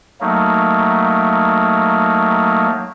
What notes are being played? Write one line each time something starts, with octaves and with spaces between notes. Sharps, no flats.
F#3 A3 A#3 D#4